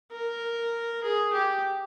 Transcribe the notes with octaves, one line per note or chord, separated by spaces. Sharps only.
A#4
G#4
G4